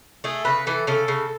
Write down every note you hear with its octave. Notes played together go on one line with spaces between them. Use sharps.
A3 G#4
C#3 B4
E3 A4
C#3 A4
C#3